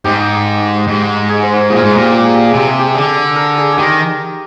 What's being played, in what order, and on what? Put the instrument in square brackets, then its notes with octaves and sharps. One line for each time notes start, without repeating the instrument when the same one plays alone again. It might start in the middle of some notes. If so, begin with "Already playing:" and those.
[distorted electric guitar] G#2 [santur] G4
[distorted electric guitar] G#2
[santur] G#4
C5
A#4
[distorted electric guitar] A#2 [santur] G#4
[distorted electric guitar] G#2 [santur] G#4
[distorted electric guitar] A#2 [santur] G4
[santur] G4
G#4
G4
G#4
[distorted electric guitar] C3 [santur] G4
[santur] G#4
G4
[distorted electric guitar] D3 [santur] G#4
[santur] A#4
G#4
G#4
[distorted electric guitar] D#3 [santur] G4